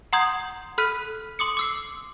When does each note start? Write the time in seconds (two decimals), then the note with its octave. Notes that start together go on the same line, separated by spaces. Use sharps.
0.13 F#5 A#5 C6 D#6 G6 G#6
0.78 A4 B5 F6 F#6 B6 D#7
1.39 C6 D6 D#6 C#7
1.57 D6 E6 C7